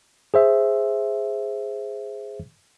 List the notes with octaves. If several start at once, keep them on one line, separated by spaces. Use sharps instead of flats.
G#4 C5 E5